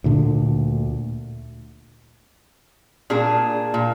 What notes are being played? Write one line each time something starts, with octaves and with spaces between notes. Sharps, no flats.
D2 A#2 D3 D4
A#2 D4 G#4
A#2